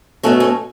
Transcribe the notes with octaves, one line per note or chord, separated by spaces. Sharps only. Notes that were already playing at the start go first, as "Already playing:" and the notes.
B2 F#3 A3 C#4
C#4